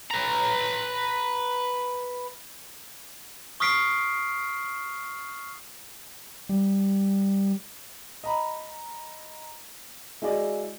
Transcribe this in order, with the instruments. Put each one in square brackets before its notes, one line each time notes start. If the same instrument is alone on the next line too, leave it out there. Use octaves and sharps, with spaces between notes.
[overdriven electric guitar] B4 A#5
[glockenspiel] C#6 D#6 F6 B6 C7 D7
[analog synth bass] G3
[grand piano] D#5 A#5 B5
G#3 E4 F#4 G#4 D5 D#5